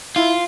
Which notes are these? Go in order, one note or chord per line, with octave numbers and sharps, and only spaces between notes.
E4 F4